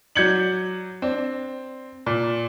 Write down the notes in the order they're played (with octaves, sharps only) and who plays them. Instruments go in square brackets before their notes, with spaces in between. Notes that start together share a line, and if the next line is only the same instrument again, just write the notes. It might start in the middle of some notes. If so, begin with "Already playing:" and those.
[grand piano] F#3 D5 G6 G#6 C#7 F#7
C4 D4
A#2